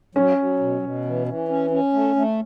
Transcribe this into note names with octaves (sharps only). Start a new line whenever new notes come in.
F#3 C#4
F#3
B2
B2
E3
E3
C#4
C#4
A3
A3